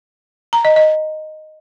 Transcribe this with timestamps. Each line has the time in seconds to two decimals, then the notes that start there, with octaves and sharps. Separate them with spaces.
0.53 A#5
0.65 D#5
0.76 D#5